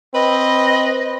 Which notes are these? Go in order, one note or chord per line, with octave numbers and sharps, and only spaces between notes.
C4 B4 D#5